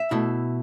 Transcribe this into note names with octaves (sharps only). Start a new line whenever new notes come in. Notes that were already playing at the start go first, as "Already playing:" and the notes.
Already playing: E5
B2 A3 E4